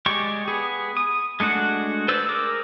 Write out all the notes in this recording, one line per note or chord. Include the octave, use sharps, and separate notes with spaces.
G#3 G4 D5 C#6
B3 G#4
D#6
G#3 A3 D4 F#4 F#5
B4 C5 D5 E6
G#4 A#4 D6